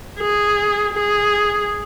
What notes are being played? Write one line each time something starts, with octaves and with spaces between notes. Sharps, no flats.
G#4
G#4